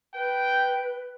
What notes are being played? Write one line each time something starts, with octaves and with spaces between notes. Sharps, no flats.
B4 G5